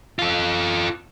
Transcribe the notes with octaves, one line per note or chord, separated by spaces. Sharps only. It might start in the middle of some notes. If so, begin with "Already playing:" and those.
F4 A4